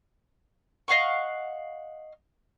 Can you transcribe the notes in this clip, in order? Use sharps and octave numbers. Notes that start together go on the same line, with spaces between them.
D#5 F5 F#5 C#6